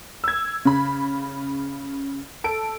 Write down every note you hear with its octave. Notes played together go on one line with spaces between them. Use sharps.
E6 G#6
C#3 B5
A4 D7